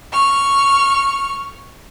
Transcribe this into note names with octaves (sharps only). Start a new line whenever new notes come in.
C#6 F6